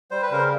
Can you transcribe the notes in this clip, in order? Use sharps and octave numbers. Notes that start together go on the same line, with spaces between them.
G3 C5
B4
C#3 A#4 C5